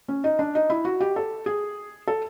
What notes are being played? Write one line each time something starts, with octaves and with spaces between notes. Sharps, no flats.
C#4
D#4
D4
D#4
E4
F#4
G4
A4
G#4
A4